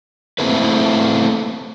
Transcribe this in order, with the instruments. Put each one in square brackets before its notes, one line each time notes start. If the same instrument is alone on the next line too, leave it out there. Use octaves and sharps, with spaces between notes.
[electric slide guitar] A3 A#3 C4 E4 G#4 B4